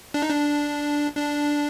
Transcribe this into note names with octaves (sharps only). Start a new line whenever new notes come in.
D4
D#4
D4
D4